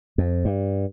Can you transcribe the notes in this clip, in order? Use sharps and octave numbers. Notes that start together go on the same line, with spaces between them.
F2
G2